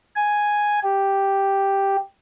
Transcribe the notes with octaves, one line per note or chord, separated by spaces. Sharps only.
G#5
G4